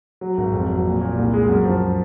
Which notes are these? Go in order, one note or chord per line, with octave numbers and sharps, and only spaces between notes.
F#3
G#1
F2
F#3
A#2
A#2
C2
G#3
F#2
F3